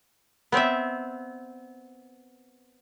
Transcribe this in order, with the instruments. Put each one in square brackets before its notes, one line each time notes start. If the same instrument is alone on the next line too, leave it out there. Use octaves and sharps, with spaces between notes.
[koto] B3 C4 D5 E5